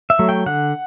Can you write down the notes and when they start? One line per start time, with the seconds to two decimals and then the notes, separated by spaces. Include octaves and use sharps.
0.10 E5
0.19 F#3 A3
0.29 G5
0.46 D3 F#5